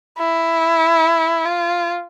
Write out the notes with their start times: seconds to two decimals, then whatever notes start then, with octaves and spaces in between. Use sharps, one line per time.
0.18 E4
1.45 F4